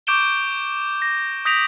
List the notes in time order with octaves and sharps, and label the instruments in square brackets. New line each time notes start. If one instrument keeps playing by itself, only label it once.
[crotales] C#6 D6 G6 D7 E7 G7
A#6
D#6 G6 A#6 B6 D7 F7